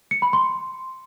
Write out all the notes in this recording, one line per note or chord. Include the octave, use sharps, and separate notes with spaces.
C#7
B5
C6